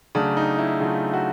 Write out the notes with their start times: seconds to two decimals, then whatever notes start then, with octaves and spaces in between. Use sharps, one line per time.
0.15 C#3 F#3 A3 D4
0.37 D#4
0.59 E4
0.80 C#3 F#3 A3 F4
1.14 F#4